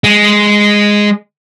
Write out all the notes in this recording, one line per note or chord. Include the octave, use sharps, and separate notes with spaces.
G#3